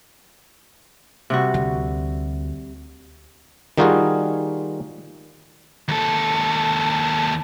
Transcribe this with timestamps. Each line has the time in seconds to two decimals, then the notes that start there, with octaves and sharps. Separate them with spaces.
1.30 C3 G3 F#4
1.54 D2
3.78 D#3 G3 D#4 F4 F#4 G#4
5.88 D#2 A4